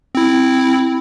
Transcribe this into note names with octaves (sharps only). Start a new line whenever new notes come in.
C4 E4